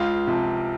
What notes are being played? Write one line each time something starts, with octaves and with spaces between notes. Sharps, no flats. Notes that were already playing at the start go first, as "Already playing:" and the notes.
Already playing: C#2 F4
C3 F3